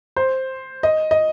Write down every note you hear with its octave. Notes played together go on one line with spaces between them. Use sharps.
C5
D#5
D#5